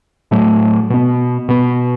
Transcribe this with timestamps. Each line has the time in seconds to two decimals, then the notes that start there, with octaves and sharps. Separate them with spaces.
0.31 A2 F#3 A3
0.90 B2 B3
1.49 B2 B3